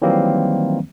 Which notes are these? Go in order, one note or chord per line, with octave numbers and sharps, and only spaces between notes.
D#3 E3 F#3 G3 A#3 C4